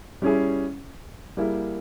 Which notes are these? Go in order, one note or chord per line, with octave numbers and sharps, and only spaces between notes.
G3 C#4 E4 G#4
G3 A#3 E4 G#4